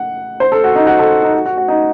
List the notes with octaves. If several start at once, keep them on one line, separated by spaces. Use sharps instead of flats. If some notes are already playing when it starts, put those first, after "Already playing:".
Already playing: F#5
C5
A4
F#4
D#4
F#4
A4
D#4
F#4
F#4
F#4
D#4